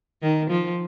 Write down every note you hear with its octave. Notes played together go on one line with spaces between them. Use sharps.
D#3
F3